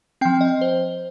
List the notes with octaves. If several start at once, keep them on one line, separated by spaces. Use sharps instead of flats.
F3 C4 G5
D#5
C5